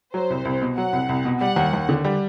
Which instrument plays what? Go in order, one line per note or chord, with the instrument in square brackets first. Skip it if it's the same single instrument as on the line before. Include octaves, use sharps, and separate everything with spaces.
[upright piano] F#3 [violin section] C5
[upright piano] C2
C2
B2
[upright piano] F#3 [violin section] F#5
[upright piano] C2
C2
B2
[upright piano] G3 [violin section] F#5
[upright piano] D#2
D#2
D3
G3